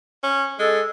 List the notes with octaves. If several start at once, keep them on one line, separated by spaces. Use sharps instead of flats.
C#4
G#3 A4